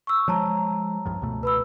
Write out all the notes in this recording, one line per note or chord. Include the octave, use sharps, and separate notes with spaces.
C#6 E6
F3 G#3 C#5 A5 A#5
C2 G2 F3
C#2 B2 A3
B4 B5 E6